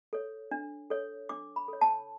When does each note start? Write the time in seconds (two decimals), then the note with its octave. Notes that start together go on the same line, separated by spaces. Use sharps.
0.13 A4 C#5
0.51 D4
0.90 A4 C#5
1.29 D4 D6
1.56 B5
1.68 A4 C#5
1.81 A5